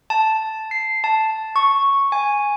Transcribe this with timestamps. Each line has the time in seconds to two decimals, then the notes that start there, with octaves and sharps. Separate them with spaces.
0.10 A5
0.71 C7
1.04 A5
1.56 C#6
2.12 G#5